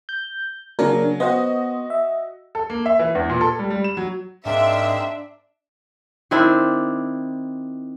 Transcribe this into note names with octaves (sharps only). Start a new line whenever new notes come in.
G6
C#3 F#3 A#3 D4 A#4
B3 F#4 C5 D#5
E5
A4
A#3
E5
E3
E2
A#2
A4
G3
G3
E7
F#3
G#2 G#3 A#3 C4 D4 E5
D#3 C4 D4 E4